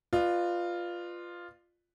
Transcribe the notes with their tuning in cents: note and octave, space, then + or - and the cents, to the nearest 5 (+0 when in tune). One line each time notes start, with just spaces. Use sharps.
F4 +0 B4 +0 D5 +45